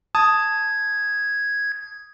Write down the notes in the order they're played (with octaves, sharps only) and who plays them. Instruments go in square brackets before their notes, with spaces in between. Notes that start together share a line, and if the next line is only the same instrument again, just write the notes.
[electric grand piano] A5 D#6 [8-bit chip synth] G#6